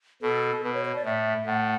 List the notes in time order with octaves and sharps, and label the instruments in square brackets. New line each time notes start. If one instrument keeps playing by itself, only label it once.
[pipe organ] B2 [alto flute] A4
[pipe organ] B2 [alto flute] B4
[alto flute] C#5
C#5
D5
[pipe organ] A2 [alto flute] E5
[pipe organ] A2 [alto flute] F#5